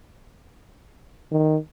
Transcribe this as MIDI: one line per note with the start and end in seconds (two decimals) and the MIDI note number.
1.32 1.57 51